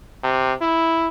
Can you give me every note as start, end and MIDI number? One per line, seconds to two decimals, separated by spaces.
0.23 0.53 48
0.61 1.08 64